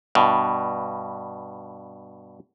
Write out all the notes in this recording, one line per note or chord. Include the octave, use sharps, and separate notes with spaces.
G2 B2